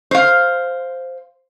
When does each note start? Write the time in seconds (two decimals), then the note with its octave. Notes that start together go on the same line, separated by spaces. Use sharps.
0.11 C5 F5